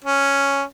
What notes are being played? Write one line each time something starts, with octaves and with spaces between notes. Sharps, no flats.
C#4